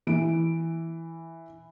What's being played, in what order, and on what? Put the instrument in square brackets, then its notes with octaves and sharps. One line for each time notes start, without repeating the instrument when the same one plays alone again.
[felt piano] E3 D7